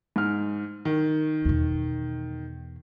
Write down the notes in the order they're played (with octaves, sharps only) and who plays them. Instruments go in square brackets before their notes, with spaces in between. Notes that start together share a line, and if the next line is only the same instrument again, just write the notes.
[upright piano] G#2 F6
D#3
[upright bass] E2 B2